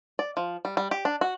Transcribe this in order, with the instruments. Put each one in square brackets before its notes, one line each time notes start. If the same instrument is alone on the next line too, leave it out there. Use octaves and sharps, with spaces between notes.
[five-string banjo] D5
F3
G3
G3
G4
D4
F#4